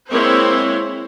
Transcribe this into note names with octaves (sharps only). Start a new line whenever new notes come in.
G#3 A#3 C4 E4 C5 C#5